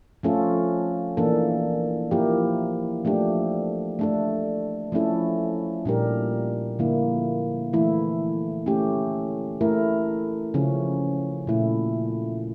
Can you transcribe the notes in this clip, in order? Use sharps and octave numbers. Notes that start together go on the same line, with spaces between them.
F3 A3 C#4 F4 A4
E3 A#3 D4 A4
F3 A#3 E4 G4 A#4
F3 A3 D4 G4
A3 D4 A4
F3 A3 C#4 E4 A4
A#2 G3 D4 G4 A#4
D3 F3 A#3 E4
E3 A3 E4
A3 C#4 G4
A3 E4 A#4
C#3 F3 C#4
A#2 A3 E4